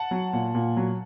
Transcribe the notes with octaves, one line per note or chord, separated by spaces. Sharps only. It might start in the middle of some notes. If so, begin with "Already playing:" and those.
Already playing: F#5 A5
F#3
A#2
A#2
F#3